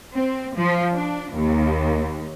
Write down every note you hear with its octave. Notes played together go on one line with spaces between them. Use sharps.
C4
F3
D4
D#2